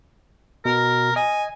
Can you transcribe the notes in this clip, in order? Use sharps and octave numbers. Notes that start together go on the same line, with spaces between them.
B2 A#4
D#5 G#5